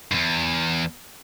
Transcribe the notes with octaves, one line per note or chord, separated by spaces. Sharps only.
E2 G2